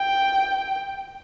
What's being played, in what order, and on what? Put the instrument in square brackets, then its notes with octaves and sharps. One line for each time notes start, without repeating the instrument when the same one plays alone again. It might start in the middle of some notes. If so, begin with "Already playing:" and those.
Already playing: [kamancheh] G5